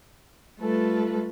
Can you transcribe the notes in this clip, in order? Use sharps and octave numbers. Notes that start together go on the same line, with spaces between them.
G3 A3 F4 A4 B4